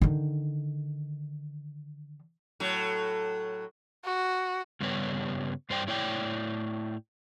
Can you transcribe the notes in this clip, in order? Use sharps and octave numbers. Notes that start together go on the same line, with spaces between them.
D3 D#3
A2 F#3
F#4
G2 C#3 G3 B3 C#5
G2 C5 D5 G5
A2 E4 C#5 D5 G5